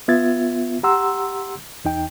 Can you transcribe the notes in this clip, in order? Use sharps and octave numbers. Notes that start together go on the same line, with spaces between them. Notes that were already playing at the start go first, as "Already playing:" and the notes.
B3 F4 E5 G#6 A6
G4 F#5 A#5 C6 E6
E2 D#4 G5